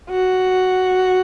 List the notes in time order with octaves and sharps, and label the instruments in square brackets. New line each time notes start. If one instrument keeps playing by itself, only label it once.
[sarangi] F#4